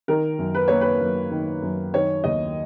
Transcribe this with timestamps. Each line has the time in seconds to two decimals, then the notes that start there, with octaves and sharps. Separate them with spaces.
0.08 D#3 A#4
0.39 F#2
0.55 B4
0.68 A#3 C#5
0.81 B4
1.01 F#2
1.31 D#3
1.62 F#2
1.93 D#3 C#5
2.24 D#2 D#5